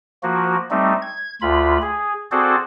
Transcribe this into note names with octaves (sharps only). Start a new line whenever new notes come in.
F3 A#3 F#4
G3 A3 C4 D#4
G#6
D2 F4 B5
G#4
C4 F#4 G#4 A4 C5 D5